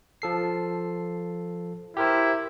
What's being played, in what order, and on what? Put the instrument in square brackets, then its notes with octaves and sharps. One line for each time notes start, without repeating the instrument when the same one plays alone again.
[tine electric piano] F3 A4 C7
[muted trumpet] E4 [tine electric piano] G4 A#4 C5